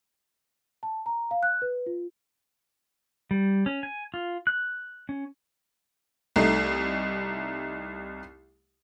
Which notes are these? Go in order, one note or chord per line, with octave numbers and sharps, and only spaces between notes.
A5
A#5
F5
F#6
B4
F4
G3
C#4
G#5
F4
F#6
C#4
C2 A3 D#4 C7